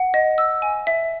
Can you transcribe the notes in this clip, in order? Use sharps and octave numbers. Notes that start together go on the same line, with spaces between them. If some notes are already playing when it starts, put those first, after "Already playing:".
Already playing: F#5
D#5
E6
G#5
E5